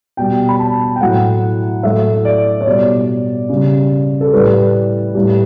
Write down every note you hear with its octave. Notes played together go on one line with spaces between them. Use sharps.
B2 G3 G5
B5
A5
G5
A2 F#3 A3 F#5
A2 F#3 A3 E5
D5
C#5
B2 G3 D5
C#3 G3
A4
A2 G3 B4
A2 G3